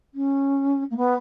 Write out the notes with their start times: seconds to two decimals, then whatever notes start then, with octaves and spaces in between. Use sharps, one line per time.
0.14 C#4
0.90 A#3
0.96 B3